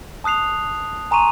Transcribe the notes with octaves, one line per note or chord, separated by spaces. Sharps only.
A5 D#6 F#6 C7 F7
G#5 A#5 C6 C#6 D#7 F7